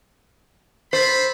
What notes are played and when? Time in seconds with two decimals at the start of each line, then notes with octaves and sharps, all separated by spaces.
0.93 A4 C5 B5